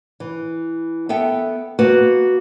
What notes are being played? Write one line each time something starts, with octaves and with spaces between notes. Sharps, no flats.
E3
B3 A4 E5 G5
A#3 B3 F#4 B4